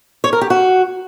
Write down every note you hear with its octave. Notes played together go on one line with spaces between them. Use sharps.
C#5
A#4
G4
F#4